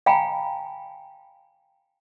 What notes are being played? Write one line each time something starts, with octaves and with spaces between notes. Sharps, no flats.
F5 G5 G#5 A#5 B5